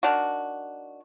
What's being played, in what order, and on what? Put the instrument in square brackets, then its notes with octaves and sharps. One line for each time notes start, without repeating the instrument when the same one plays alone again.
[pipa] D#3 D4 F#4